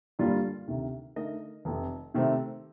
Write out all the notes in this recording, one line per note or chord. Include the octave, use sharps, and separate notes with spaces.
G2 D3 G3 A#3 F4
D2 C3 D#3
D3 A3 D#4 A#4 D#5
F1 F2 C3
C3 D#3 A3 C4